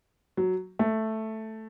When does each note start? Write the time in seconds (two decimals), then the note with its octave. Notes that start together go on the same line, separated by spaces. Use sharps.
0.37 F#3
0.79 A3